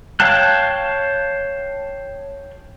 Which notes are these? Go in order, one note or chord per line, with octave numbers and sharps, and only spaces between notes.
C#5 F5 G5 A5 F#6